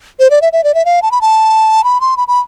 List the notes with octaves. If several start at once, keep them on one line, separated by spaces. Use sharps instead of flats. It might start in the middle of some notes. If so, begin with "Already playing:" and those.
C5
D5
E5
E5
D5
E5
F5
A5
B5
A5
B5
C6
B5
B5